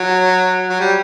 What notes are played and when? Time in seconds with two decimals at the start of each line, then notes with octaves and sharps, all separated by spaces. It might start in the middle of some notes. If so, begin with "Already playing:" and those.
Already playing: F#3
0.70 F#3
0.80 G3